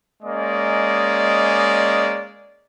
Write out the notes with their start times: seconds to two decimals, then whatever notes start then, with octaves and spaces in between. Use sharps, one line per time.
0.23 G#3 A#3 C#4 D5 D#5